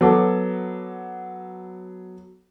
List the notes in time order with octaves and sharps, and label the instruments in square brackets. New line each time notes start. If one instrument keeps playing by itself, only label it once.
[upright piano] F#3 B3 A4 D6